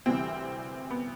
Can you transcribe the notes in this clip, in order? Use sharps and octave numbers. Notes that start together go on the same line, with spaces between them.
D2 C3 E3 G3 C4
B3